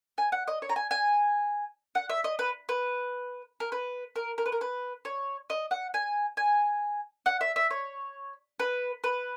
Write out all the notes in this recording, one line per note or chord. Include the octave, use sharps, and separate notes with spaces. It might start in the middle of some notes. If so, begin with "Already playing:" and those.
G#5
F#5
D#5
C#5
A#5
G#5
G#5
F#5
E5
D#5
B4
B4
A#4
B4
A#4
A#4
B4
A#4
B4
C#5
D#5
F#5
G#5
G#5
F#5
E5
E5
C#5
B4
B4